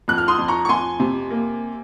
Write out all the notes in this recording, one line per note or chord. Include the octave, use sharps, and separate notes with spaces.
F2 F#6
F6
C6 D#6
F2
A#5 C#6
C#6
F2 G#5 C6
C3
A#3